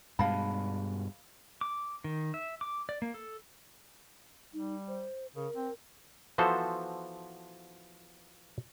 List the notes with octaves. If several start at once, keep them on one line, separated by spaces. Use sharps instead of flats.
G2 B2 G#3 F5 A5 B5
D6
D#3
E5
D6
D5
A#3
A4
G3 D#4
C5
C#3 A#4
C4
E3 F3 B3 F#4 A4 C5